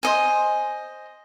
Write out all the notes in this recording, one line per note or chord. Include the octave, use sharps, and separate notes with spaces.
C5 D#5 G#5